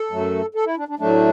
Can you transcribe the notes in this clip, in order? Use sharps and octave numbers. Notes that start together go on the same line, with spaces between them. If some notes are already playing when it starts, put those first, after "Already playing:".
Already playing: A4
F#2 F#3 A3
A4
E4
D4
D4
A2 F#3 A3 D4